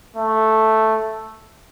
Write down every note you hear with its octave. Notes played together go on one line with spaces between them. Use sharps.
A3